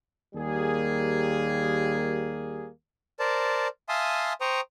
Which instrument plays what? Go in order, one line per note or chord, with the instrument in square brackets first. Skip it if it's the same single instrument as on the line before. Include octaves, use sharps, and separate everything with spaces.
[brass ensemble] D#2 G3 A#3 G#4
[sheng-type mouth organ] A#4 C5 D5 A5
E5 F5 G#5 A5 C6 D#6
C5 G5 A#5 C#6 D#6